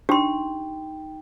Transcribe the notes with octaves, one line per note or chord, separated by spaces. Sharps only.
D4 D#4 G4 G5 C6